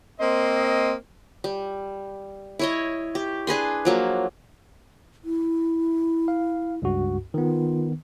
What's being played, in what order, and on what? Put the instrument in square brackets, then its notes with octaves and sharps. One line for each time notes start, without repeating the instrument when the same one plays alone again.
[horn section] A#3 C4 C5 D#5
[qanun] G3
E4 C#5 D#5
G4
D4 G#4 B4 C6
F3 F#3 A#3
[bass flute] E4
[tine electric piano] F5
C#2 G2 F#4
[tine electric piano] D#3 B3 [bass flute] F4